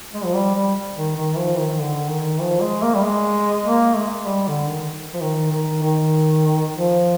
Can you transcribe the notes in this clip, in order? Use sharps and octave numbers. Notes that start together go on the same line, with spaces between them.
G#3
F3
G3
G3
D#3
D#3
F3
D#3
D3
D#3
F3
G#3
A#3
G3
G#3
A#3
G#3
G3
D3
D#3
F3
D#3
D#3
D#3
F3